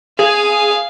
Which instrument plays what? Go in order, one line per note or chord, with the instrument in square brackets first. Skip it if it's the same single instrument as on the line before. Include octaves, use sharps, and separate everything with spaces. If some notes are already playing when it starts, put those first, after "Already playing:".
[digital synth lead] G#4 [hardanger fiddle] F5